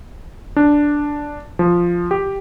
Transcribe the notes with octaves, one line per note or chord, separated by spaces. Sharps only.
D4
F3
G4